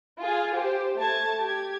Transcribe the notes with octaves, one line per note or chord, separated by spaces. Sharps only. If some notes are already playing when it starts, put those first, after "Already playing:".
F4 G#4
G4 C5
A3 A5 G#6
G4 G#6